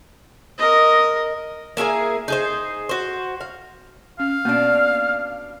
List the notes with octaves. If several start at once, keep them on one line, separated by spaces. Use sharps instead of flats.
A#4 D#5
A#3 E4 G#4 G#5
D#4 G#4 C5
F#4 C5
F5
C#4 F5
B2 A#3 B3 C#4 D4